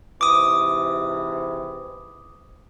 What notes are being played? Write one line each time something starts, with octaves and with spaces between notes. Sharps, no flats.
G#2 C3 E3 D6 D#6